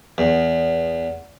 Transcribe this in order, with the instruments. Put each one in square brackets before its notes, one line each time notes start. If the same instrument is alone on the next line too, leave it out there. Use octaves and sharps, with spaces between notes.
[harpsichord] E2